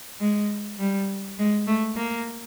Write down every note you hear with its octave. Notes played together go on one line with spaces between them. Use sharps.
G#3
G3
G#3
A3
A#3